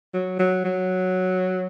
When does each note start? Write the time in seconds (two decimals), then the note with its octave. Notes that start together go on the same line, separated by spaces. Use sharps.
0.14 F#3
0.39 F#3
0.65 F#3